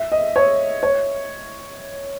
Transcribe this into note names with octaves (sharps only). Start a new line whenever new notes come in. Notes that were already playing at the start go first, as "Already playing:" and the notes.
Already playing: E5
D#5
C#5
C#5